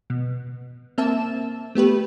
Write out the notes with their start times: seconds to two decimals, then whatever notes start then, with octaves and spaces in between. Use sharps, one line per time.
0.10 B2
0.98 A#3 C4 E5 A5 E7
1.75 A3 B3 G4 B4